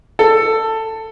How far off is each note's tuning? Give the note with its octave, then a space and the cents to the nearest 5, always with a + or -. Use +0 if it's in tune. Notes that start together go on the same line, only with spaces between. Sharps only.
A4 +15